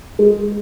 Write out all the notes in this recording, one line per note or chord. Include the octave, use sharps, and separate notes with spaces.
G#3